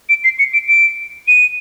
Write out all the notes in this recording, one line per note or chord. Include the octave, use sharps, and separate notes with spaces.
D7
C7
C#7
D7
D7
D#7